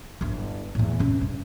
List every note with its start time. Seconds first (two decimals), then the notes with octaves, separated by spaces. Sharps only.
0.21 G1 E4
0.75 E2 A2
0.99 C3 C#4
1.21 G2